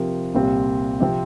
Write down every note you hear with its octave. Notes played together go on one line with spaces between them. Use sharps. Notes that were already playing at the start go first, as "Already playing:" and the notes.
Already playing: C3 F3 C4 G4 A#4
C2 A#2 G3 C4 F4
C3 F3 C4